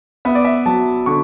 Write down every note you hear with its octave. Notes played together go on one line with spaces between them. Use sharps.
B3 E5
D5
E5
F#3 A5
D3 C#6